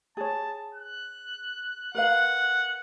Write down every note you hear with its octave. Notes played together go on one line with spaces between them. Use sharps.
G#4 C#5 A5
F#6
A#4 B4 F5 F#5